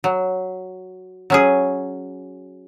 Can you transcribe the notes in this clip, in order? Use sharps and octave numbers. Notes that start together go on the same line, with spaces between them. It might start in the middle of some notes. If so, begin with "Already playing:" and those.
F#3
F#3 C#4 G#4